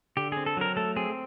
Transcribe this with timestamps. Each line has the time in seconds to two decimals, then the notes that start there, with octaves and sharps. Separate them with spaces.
0.17 D3 G4
0.32 C4 G#4
0.46 A4
0.57 F#3 A#4
0.77 A3 A4
0.96 C4 G#4